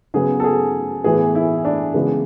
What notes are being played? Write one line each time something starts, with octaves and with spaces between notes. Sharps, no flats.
C#3 F#3 B3 G#4
A4
G#4
A2 E3 B3 G#4
E4
D4
C#3 E3 G#3 B3